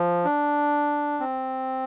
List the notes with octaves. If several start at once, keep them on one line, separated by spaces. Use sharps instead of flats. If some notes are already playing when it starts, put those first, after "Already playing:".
Already playing: F3
D4
C4